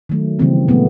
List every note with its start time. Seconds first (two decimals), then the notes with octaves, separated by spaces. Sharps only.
0.09 D#3 F#3 A3
0.39 C#3 E3 G3 A#3 C4
0.68 A#2 F#3 A3 B3